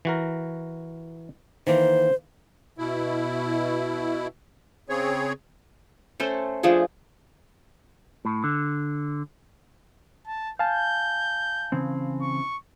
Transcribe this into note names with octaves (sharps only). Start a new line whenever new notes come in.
E3 F#4 A#4
D#3 E3 A#3 C5
B2 E4
C#3 C4 G#4 C#5
A3 C#4 A4 C5
F3 A3 D4 G#4
A2
D3
A5
F5 G#5 A5 G6
C#3 E3 C4
C#6